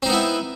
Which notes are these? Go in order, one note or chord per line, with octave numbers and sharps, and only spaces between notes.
B3 C4 D#4 E4